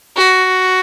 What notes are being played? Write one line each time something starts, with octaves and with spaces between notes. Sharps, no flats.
F#4